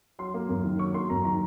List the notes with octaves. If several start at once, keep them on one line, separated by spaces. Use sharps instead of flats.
F#3 C6
A#3
F#2
D#3
F#3 C#6
A#3 C6
F#2 A#5
D#3 A#5